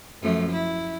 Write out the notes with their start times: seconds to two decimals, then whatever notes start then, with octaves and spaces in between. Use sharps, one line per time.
0.22 F#2 F3 A3
0.51 E4